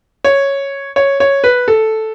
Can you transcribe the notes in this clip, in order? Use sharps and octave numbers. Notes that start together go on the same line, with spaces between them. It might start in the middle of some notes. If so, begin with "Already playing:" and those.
C#5
C#5
C#5
B4
A4